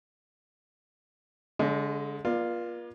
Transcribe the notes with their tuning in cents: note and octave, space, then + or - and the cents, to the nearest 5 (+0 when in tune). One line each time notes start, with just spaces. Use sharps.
D3 -35 G#3 +0 D#5 +20
A#3 +45 F4 +0 D5 +25